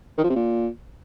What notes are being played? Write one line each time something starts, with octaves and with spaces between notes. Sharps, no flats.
D#3
F3
C3
A#2